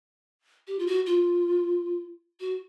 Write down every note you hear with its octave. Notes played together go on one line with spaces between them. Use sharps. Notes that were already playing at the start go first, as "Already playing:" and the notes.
G4
F4
F#4
F4
F#4